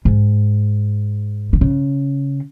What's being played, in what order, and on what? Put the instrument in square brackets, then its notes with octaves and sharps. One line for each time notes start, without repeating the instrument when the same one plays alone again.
[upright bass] G#2
D3
C#3